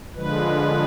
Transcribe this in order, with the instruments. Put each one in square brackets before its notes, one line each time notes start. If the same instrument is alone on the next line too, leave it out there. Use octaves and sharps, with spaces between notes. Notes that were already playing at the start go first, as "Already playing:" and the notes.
[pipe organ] D3 F3 G#3 B4